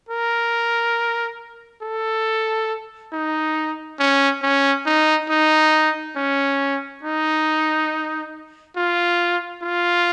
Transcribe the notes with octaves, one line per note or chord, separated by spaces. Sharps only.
A#4
A4
D#4
C#4
C#4
D#4
D#4
C#4
D#4
F4
F4